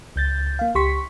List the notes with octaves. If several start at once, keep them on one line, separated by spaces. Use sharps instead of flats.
C#2 G6 A6
A#3 F5
C#2 G4 C6 C#6 B6